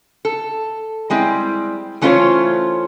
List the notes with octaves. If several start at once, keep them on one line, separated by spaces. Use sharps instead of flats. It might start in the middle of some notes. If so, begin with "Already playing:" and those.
A4
G3 G#3 C4 E4
E3 A3 C#4 F4 C5 C#5